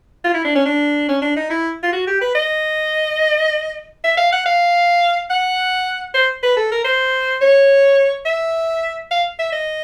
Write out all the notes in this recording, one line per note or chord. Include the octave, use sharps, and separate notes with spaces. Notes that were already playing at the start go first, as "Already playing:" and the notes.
F4
E4
D4
C#4
D4
C#4
D4
D#4
E4
F4
F#4
G4
B4
D#5
E5
F5
F#5
F5
F#5
C5
B4
A4
A#4
C5
C#5
E5
F5
E5
D#5